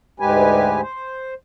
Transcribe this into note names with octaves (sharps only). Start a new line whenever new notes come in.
D2 G#2 G#3 G4 B4 G#5
C5